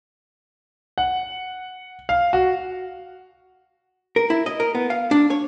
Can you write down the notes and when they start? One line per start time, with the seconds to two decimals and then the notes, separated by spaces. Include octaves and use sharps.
0.98 F#5
2.09 F5
2.33 F#4
4.16 A#4
4.30 E4
4.46 D#5
4.60 A#4
4.75 B3
4.90 F5
5.11 D4
5.30 C#5